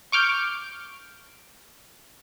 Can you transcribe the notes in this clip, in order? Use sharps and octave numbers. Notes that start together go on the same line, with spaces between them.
C#6 D6 F6 G6